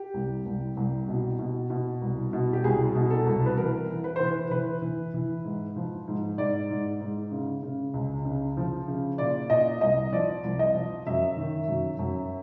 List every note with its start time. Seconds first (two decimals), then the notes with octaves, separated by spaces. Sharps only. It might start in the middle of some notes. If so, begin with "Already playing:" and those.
Already playing: G4
0.14 C2
0.46 C2
0.77 C2
1.08 B2
1.39 B2
1.70 B2
2.02 C2
2.33 B2
2.53 G4
2.64 C2 G#4
2.95 B2
3.10 A4
3.26 C2
3.46 B4
3.57 E3 A#4
3.88 E3
4.04 B4
4.16 E3 C5
4.27 B4
4.50 E3 B4
4.82 E3
5.14 E3
5.44 G#2
5.76 F3
6.08 G#2
6.38 G#2 D5
6.70 G#2
7.01 G#2
7.31 C#3
7.63 C#3
7.94 C#2
8.25 C#3
8.57 F3
8.88 C#3
9.18 A#2 D5
9.50 A#2 D#5
9.81 C2 D#5
10.12 F3 D5
10.43 C2
10.59 D#5
10.74 F3
11.07 F#2 E5
11.37 D#3
11.68 F#2
11.99 F#2